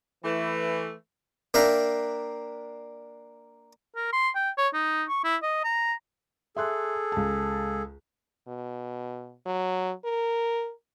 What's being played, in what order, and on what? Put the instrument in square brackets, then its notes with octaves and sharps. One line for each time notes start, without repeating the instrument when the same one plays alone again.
[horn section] E3 A3
[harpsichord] A#3 D4 E5 F5 G5 A#5
[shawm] A#4
C6
G5
C#5
D#4
C#6
E4
D#5
A#5
[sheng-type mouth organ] G#4 A4 [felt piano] E5 C6 F#6
[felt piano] C#2 A5
[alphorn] B2
F#3
A#4